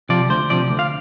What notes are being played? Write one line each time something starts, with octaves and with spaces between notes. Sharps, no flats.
C3 F3 D5
D2 C5
C3 F3 D5
D2
F5